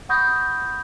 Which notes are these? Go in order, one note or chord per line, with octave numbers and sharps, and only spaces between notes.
F#5 B5 C#6 D#6 G6 A#6